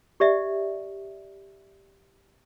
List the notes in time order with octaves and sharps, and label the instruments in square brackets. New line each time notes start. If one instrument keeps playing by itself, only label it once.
[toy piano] G4 D5 E5